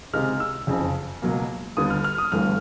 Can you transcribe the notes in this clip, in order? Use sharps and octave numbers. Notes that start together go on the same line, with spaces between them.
C#2 C3 D#3 G#3 F6
E6
F#1 F2 C#3
C#2 B2 F#3 A#3
D#2 D3 G3 B3 D#6
F6
F6
D#6
G1 G2 E3 A3 F6